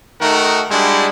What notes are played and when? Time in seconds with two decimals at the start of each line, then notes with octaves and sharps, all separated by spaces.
0.20 D#3 A3 D#4 F#4 A#4
0.70 G3 G#3 D4 E4 F#4